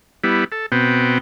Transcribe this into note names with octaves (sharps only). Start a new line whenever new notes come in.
G3 B3 E4
A4
B2 B3 C4 G5